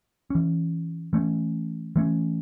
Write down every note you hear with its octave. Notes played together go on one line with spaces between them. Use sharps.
E3 C#4
E3 A3 C#4
E3 A3 C#4